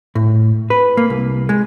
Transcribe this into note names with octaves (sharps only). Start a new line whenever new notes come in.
A2
B4
A#3
C2
G#3